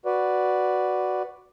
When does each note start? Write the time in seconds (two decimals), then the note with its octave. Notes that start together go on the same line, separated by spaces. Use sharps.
0.06 F#4 B4 D5